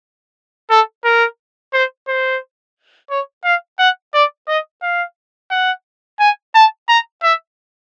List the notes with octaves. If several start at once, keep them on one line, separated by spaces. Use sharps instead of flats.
A4
A#4
C5
C5
C#5
F5
F#5
D5
D#5
F5
F#5
G#5
A5
A#5
E5